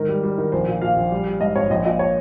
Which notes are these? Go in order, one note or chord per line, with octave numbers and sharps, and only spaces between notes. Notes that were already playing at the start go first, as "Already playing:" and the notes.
Already playing: G#2 D#3 A#4
G3
G3
D#3
A#1 C5
A#2
A#2 F5
A#1
G3
G3
G#2 D#5
G#1 C#5
A#1 D#5
A#2 D#5
C#5